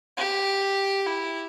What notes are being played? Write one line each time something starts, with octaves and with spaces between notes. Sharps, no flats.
G4
E4